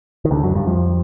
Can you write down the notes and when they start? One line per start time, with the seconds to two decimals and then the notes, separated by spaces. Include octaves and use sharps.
0.25 D#3
0.31 D2 D3
0.43 F#2 F#3
0.55 G2 G3
0.67 F2 F3